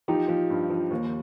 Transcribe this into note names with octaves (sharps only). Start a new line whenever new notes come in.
F3 D#4 G4
F3
G2
F3
D#2